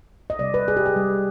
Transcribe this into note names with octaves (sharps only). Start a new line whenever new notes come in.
D#5
C3 G3 D5
B4
G#4
G4
G#4
C3 G3